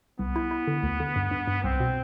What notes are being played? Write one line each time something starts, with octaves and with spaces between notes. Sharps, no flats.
C2 B3
E4
E4
D3
D2
D3
G2
G2
G2
C2 C4
B2